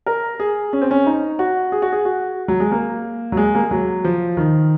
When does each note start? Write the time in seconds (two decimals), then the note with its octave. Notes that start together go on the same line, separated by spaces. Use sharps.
0.06 A#4
0.40 G#4
0.73 C#4
0.82 C4
0.91 C#4
1.06 D#4
1.39 F#4
1.72 G#4
1.82 F#4
1.92 G#4
2.05 F#4
2.48 F#3
2.60 G#3
2.72 A#3
3.32 F#3
3.37 G#3
3.55 A#3
3.63 G#3
3.71 F#3
4.04 F3
4.37 D#3